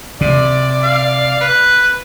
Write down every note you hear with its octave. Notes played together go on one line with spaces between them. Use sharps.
C3 D5
F5
B4